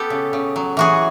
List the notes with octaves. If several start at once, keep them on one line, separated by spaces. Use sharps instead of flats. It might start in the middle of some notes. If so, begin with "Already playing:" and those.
Already playing: B3 G4 A4
C#3
C#3
F#3
E3 F#4 G#4